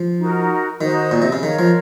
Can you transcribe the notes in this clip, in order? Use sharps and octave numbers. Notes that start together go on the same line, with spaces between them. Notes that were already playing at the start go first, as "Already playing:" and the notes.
Already playing: F3
D#4 F#4 A#4
D#3 D#4 F#4 C5 D#5
A#2
C3
C#3
D#3 A#4 C#5 F5
F3